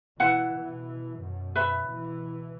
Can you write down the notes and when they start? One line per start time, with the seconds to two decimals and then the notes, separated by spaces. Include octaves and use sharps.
0.20 B2 E3 E4 B4 F#5
0.54 B2 E3
1.22 F#2 B2
1.55 B4 E5 B5
1.89 B2 E3